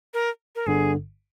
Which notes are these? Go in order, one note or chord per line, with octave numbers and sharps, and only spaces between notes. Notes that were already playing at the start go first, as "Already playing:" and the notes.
A#4
A#4
G1 G2 D3 G#4